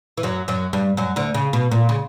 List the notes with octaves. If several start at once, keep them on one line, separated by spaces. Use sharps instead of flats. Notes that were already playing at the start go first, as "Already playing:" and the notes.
E3
F#2 F#3
F#2 F#3
G2 G3
F#2 F#3
D2 D3
C#3
B2
A#2
C#3